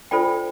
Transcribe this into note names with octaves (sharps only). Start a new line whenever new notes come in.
D4 F4 A4 C5 D5 G5